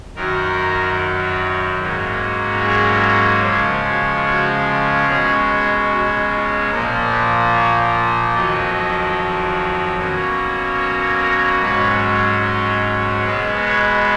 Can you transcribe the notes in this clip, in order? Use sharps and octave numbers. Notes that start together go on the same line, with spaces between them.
F#2 D#3 F#3 A#4
G#2 F#3 A#3 C#4
G#4
C#3 F3 G#3 C#4 F4
F#4
F#4
B2 G#3 C#4 G#4
F#4
F4
A#2 F3 A#3 A#4
B4
C#5
F2 D#3 F#3 D#5
B2 F#3 A#3 C#4
C#5
A#4
G#2 F#3 C#4 B4
D#5
B2 G#3 B3 B4
C#5